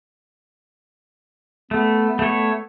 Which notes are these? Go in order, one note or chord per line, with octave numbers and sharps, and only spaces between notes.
A3 B3
A3 C#5